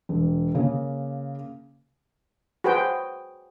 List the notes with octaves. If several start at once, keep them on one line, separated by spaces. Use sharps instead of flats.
E1
C#3 A#3
F#4 G#4 B4 C5 G5